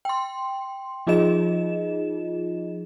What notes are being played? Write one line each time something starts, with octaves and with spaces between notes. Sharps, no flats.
G5 C6
F3 D#4 F4 G#4 D#5 E7